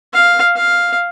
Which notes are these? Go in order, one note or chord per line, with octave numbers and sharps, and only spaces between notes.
F5
F5